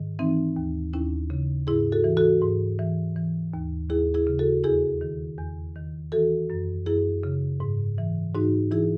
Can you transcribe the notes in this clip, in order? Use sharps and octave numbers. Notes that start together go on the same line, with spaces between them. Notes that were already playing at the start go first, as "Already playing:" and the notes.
Already playing: G#2 D#3
E3 C4 D#4
D#2
D#2 C#4 E4
C#3
G#2 E4 G#4
F#4 A4
E3
F#4 A4
G#2
E3
E3
D#2
D#2 E4 G#4
E4 G#4
C#3
F#4 A4
E2 E4 G#4
D#3
E2
D#3
E3 F#4 A4
F#2
F#2 E4 G#4
C#3
G#2
E3
G#2 D#4 F#4
E3 E4 G#4